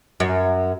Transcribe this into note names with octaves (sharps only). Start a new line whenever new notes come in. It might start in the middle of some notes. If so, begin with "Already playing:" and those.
F#2